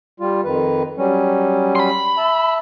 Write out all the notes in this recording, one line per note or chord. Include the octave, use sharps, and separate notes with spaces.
G3 F4
F2 D#3 B4
F#3 G3 C#4
B5 C6
E5 A5